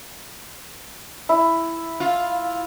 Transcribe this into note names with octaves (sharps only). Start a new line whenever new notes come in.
E4
F4